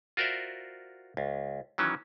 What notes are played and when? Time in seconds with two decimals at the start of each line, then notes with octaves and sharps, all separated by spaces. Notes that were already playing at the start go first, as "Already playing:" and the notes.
0.17 F4 F#4 A#4 C5 D5 E5
1.17 C#2
1.78 D#3 E3 F#3 C#4